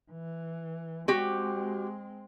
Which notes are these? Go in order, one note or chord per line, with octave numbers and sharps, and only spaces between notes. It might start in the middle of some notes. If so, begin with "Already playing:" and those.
E3
G#3 C4 F#4 G4